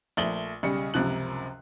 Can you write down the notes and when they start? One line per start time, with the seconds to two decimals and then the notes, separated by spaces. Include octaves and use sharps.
0.17 A#1 A3 F#7 G7
0.63 B1 C#3 G3 C#7
0.94 C#2 F#2 C3 F3 F#6 F#7